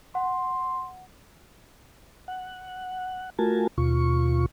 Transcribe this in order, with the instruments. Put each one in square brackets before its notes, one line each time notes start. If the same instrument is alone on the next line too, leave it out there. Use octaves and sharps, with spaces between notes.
[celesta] F#5 [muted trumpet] C6
[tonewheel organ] F#5
A3 F4 F#4 A#4 G#5 A5
D#2 B2 F4 C#6